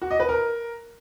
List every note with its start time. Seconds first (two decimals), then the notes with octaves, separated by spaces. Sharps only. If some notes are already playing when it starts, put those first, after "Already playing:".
0.02 F#4
0.11 D#5
0.20 B4
0.29 A#4